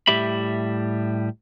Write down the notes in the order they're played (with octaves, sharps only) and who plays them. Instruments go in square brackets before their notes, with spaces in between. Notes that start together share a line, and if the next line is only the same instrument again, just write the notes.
[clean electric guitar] A2 G3 G4 E5 B5